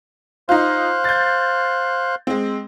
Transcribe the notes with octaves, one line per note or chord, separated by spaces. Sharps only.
D#4 F4 C5 F5 F#6
G6 A6
G#3 C4